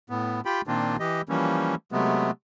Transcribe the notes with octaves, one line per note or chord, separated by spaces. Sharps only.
A2 B3
F4 G4 G5 B5
A#2 D#3 A#3 C4 D4 F4
E3 G4 D#5
E3 F3 G3 A#3 C#4
C3 F#3 G#3 A3 B3